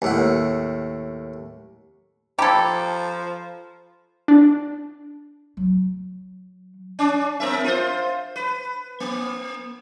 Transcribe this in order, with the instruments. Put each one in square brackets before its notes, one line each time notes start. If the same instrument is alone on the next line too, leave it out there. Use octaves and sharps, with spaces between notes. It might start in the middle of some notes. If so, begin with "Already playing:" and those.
[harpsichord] D#2 A2 F#5
[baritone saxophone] F3 [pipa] G4 A4 [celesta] A#5 B5 G#6
[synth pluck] D4
[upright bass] F#3
[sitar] C#4 D4
B3 A#4 E5
F4 C5
B4
A#3